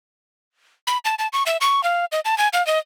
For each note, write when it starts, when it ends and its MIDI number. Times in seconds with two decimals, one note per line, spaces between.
0.87 0.98 83
1.05 1.15 81
1.19 1.28 81
1.33 1.43 85
1.46 1.57 76
1.61 1.83 85
1.84 2.05 77
2.12 2.20 75
2.25 2.37 81
2.38 2.48 80
2.53 2.65 77
2.67 2.79 75